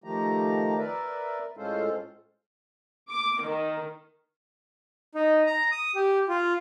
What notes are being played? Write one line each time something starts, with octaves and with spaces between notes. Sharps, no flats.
D#3 F3 A3 G4 A#5
A#4 B4 D5 E5
A2 G#3 C#4 F4 A4 C5
D6
D#3
D#4
A#5
D#6
G4
F4